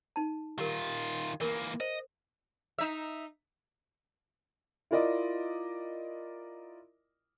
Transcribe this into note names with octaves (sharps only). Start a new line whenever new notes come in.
D#4 A5
D#3 F4 G4 A#4
E3 A#3 A#4
C5 D#5
D#4 E5
E4 F4 A#4 D5 D#5